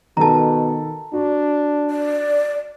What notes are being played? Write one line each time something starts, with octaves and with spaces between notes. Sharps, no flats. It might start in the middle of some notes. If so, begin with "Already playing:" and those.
B2 D#3 A4 A5 A#5
D4 F#4
D5